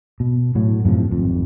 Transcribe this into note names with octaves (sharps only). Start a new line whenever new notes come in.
B2
A2 F#3
F#2 A2 C3 F3
G#1 F2